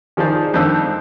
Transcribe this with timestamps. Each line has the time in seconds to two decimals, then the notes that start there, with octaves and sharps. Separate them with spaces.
0.17 D#3 F3 G#4 C5 D5
0.54 F2 D#3 C4 D4 A4 E6